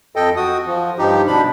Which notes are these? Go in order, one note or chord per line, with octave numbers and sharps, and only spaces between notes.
F2 A4 D#5 G5
F#4 D#6
F3
G2 F3 D#4 G4
B2 D4 B5